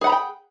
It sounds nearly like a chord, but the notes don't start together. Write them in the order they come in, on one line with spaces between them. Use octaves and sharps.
G#4 F#5 B5 A#5 G5